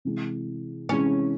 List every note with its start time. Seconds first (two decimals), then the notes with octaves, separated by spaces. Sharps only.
0.05 C3 E3 G#3
0.89 C3 E3 G#3 C#4